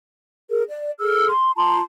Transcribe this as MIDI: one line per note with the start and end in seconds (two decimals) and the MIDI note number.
0.50 0.62 68
0.50 0.62 70
0.69 0.92 74
1.00 1.29 68
1.00 1.29 69
1.00 1.29 88
1.00 1.29 89
1.29 1.51 84
1.56 1.79 65
1.56 1.79 81
1.56 1.79 82
1.56 1.79 84